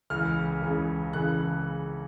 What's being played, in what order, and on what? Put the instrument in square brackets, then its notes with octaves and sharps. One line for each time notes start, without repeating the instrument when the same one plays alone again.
[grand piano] C#2 C#3 E3 F6
C#2 C#3 E3
C#2 C#3 E3 F#6